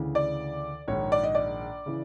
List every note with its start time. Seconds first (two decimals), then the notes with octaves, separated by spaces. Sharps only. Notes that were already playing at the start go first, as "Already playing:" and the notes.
Already playing: D2 C#3 E3
0.15 D5
0.88 A#1 G#2 D#3 C#5
1.12 D5
1.23 D#5
1.35 D5
1.86 C#3 E3